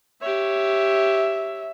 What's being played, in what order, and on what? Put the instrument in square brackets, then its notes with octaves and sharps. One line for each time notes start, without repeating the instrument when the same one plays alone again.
[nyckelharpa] G4 C#5 [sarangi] E5